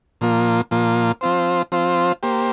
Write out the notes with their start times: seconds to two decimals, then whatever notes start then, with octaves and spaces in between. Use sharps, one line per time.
0.21 A#2 F3 A#3 F4
0.71 A#2 F3 A#3 F4
1.21 F3 C4 F4 C5
1.72 F3 C4 F4 C5
2.23 A#3 G4 C5